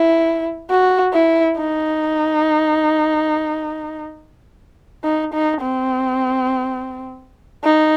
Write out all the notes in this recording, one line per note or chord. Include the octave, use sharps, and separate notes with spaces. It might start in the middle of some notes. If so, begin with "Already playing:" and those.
Already playing: E4
F#4
E4
D#4
D#4
D#4
C4
D#4